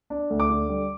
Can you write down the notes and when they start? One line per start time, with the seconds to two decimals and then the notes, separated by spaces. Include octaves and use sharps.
0.10 D4
0.30 D2
0.40 D6
0.50 D3
0.69 G3